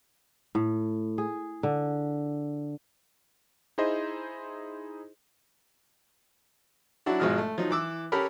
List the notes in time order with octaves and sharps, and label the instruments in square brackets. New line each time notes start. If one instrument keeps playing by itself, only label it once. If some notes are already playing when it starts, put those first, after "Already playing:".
[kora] A2
G#4
D3
[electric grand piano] D#4 E4 G#4 C5 D#5
[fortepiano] F#3 D4 E4 F#4
G#1 B2 F3 G#3 D#5 F6
A3
F3 F#3 D#4
E3 D6 E6
C#4 G4 A4 A#4 B5